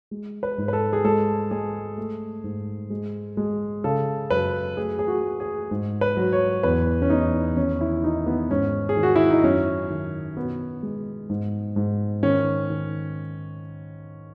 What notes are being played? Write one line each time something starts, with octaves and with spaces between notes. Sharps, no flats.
G#3
B4
G#2
B4
A4
G#4
G#3 A4
G#3 G#4
A3
G#2
G#3
G#3
C#3 A4
F#2 B4
A3 G#4
G#4
F#4
A3
G#4
G#2
B4
F#3
C#5
E2 B4
C#4
E2 D#4
D#3 C#4
E4
D#3 D#4
B3
G#2 C#4
G#4
D#3
F#4
E4
D#4
F#2 C#4
D#3
B2 B3
G#3
G#2
G#2
D#3 C#4
D#3